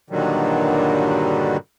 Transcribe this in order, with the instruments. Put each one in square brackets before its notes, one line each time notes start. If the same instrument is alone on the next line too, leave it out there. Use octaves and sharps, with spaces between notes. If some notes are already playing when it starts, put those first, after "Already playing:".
[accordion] G2 A#2 D3 D#3 F#3 G3